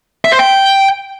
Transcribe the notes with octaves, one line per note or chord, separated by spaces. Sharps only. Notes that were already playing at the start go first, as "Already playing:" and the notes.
E5
C5
G5